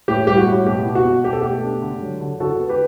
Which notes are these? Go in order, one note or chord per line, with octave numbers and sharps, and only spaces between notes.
A2 G4
G3 G4
F#4
A2
B2 G4
B2
F#4
B2
B2 G4
A4
A3 G4
D4
D3
F#3
D3
D3 F#4 A4
B3
G4 B4